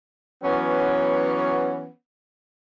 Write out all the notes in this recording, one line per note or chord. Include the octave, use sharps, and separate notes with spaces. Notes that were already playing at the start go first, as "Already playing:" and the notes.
E3 F#3 B3 C#4